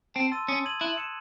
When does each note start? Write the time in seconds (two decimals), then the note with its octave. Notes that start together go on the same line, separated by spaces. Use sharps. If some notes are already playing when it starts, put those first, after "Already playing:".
0.15 C4 A5
0.32 C6 E6 A6 D#7
0.48 C#4 D#6
0.65 G#6 D#7 F#7
0.81 E4 F#6
0.98 C#7 E7